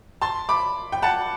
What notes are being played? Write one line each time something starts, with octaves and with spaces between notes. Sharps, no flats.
A5 C6
B5 D6
G5
F#5 A5